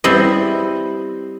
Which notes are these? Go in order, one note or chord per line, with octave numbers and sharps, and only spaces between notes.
G3 C4 E4 D#5